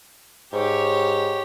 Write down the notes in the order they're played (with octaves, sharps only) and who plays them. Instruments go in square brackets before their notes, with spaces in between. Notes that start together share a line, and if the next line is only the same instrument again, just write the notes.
[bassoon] G#2 [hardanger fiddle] G4 C#5